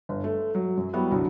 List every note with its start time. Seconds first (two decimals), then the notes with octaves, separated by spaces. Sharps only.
0.09 G1
0.24 A3
0.55 F#3
0.77 F#2
0.93 F#3 G3 B3 E4 F#4
1.11 C2 D3 F#3